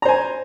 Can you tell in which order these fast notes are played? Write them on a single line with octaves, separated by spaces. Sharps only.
A#5 C5 G#5